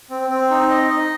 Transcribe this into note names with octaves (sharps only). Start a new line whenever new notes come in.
C4
C4
D#4
D#5
D#5